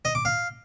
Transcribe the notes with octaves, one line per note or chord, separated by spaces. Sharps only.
D#5
D6
F5